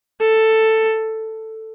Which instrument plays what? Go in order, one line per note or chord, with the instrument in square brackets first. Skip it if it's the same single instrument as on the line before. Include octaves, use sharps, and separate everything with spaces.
[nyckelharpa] A4